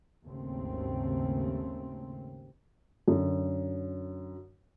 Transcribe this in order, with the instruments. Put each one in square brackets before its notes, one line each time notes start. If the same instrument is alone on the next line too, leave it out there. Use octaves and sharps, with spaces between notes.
[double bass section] G#1 D#2 C#3 A3 C4
[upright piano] F#2 D3